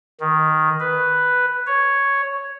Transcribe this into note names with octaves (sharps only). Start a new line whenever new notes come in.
D#3
B4
C#5